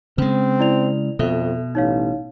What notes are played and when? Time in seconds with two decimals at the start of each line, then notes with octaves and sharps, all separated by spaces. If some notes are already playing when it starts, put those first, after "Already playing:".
0.18 C#3 G#3 C4
0.59 E4 D5 F7
1.19 F2 B2 A4 E5
1.75 A1 D#4 C#5 F5